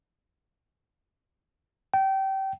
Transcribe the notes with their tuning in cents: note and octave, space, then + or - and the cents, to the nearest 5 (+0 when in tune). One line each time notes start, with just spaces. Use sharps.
G5 -25